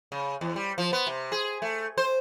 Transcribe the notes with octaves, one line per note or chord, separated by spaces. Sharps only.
C#3
E2
G3
F3
B3
C3
G#4
A3
C5